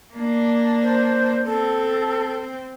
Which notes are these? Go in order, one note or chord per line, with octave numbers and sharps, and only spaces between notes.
A#3 D4
C5
C4 A4